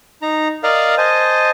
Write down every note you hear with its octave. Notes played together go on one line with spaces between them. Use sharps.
D#4 A#5
A#4 D5 D#5 F5 A#5
C5 D#5 G#5 A5